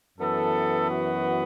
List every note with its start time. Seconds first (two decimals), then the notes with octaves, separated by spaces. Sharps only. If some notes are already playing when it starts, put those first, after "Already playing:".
0.17 F#2 E3 B3 A4
0.87 F#4